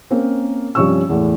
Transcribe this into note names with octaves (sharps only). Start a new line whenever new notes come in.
A#3 C4 C#4 A#4
G2 C3 F3 C#4 C#6 E6
E2 A2